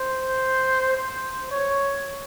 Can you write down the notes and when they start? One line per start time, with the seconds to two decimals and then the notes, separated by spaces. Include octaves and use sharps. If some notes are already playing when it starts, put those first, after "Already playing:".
Already playing: C5
0.97 C5
1.51 C#5